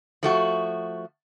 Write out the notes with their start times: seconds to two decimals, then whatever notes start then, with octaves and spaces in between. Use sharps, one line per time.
0.23 F3 A3 F#4